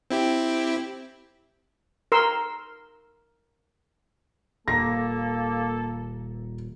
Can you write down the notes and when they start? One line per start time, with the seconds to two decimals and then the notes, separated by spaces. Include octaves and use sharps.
0.10 C4 E4 G4
2.12 A#4 C6 E6
4.68 D#1 A#3 A4 A#5 A#6